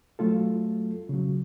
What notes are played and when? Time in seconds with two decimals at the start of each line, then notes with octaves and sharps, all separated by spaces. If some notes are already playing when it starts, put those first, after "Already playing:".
0.19 F#3 A3 F4 A4
1.09 C#3 F#3